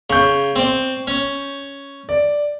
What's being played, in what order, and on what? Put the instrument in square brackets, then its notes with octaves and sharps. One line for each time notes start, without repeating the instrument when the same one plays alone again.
[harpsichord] C#3 [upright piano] C#6 G6
[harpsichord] C4 D5
C#4
[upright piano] D5